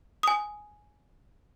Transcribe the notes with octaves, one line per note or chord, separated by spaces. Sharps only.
G#5 D#6